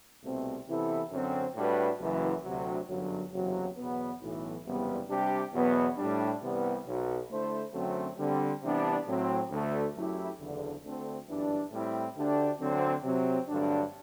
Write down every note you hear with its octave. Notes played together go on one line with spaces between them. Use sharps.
C2 B2 A3 C4
C3 E3 B3 E4 A4
F#2 D3 F#3 C4
A2 G3 D4 F#4 B4
F#1 F#2 E3
D2 C3 F#3
G1 F#2 D3 F#3
F#1 E2 C3 F#3
E2 B2 F#3 B3
B1 A2 E3
F#1 E2 C3 G3 B3
C3 G3 D4 G4
E2 B2 F#3 B3
A2 G3 D4
C2 C3 E3 G3 B3
B1 B2 F#3
D3 A3 E4 A4 C5
F#2 D3 F#3 A3 C4
D3 G3 C4
C3 E3 G3 B3 D4
A2 F#3 C4
D2 D3 A3
F#2 F#3 A3 E4 G4
F#1 E2 D3
D2 D3 A3 C4
G1 F#2 E3 G3 D4
A2 G3 C4 E4
D2 D3 A3 D4 G4
D2 D3 F#3 C4
C3 F#3 C4
G2 D3 F#3 A3 D4